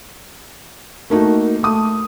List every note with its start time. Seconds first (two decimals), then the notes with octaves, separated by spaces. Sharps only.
1.10 A3 A#3 D#4 F#4
1.63 A3 D#6